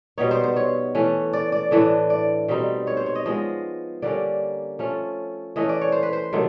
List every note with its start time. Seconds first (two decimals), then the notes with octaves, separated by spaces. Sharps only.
0.18 B2 G3 B3 D#4 C#5
0.31 C5
0.44 C5
0.56 C#5
0.95 E3 A3 C#4
1.33 D5
1.52 D5
1.71 A2 E3 A3 D4
2.10 D5
2.48 B2 G3 C4 D#4
2.87 C#5
2.97 C5
3.06 C#5
3.15 D#5
3.26 F3 G#3 B3 D#5
4.02 D3 G3 A#3 C#4 D5
4.79 F3 A3 C#4
5.56 E3 A3 C#4 D#5
5.69 D5
5.81 C#5
5.92 C5
6.03 B4
6.13 C5
6.33 C3 D#3 F#3 A3